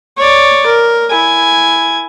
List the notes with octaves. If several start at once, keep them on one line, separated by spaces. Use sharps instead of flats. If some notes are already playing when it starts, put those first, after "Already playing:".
C#5 D5
A#4
E4 G#5